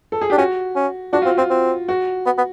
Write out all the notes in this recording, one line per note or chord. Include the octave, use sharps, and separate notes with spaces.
A4
G#4
D4 G4
C#4 F#4
C#4
D4 F#4
F4
C4
C4 F4
C4
F#4
B3
B3